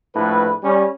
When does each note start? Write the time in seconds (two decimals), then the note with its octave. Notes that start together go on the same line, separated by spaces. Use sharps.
0.15 A#1 A2 B4
0.63 G3 C#4